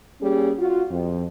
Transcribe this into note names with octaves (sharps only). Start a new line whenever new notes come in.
G3 A#3 C#4 G4 G#4
F4 F#4
F2